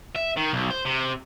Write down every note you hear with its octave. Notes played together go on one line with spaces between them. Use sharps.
E5
D#3
B1
C5
C3